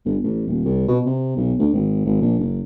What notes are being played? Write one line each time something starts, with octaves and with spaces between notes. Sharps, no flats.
G1
A1
D#1
C2
B2
C3
B1
D2
G#1
G#1
A#1
F#1